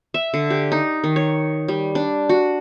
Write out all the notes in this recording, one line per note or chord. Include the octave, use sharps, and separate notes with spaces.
E5
D3
G4
D#4
D#3
C#5
G3
D4
F#4